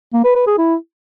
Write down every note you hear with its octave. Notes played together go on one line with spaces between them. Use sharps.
A#3
B4
B4
G#4
E4